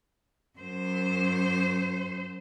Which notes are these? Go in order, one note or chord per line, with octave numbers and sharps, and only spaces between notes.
F#2 C5